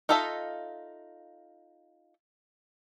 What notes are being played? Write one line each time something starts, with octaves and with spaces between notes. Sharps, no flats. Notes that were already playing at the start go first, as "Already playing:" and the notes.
D#4 F4 A4 D#5 E5